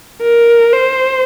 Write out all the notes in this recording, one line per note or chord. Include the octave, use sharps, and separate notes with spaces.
A#4
C5